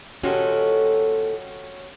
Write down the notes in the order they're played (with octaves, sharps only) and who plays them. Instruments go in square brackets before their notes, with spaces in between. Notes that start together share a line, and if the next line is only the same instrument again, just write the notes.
[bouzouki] A#2 D#3 A4 [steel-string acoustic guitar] C#4 F#4 G4